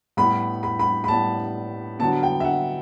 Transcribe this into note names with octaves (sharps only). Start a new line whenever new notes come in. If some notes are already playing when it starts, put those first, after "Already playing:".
A2 G3 B3 B5
B5
B5
B5
A2 G3 B3 A5
D3 F#3 B3 A5
G5
E5
F#5